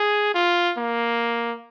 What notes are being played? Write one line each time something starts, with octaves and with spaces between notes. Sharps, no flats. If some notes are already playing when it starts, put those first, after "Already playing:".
Already playing: G#4
F4
A#3